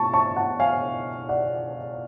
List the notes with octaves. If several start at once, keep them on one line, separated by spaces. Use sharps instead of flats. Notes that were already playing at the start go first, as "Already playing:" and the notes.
Already playing: B2 A3 A5 C#6
A5 C#6
F#5 A5
F5 G#5
D5 F#5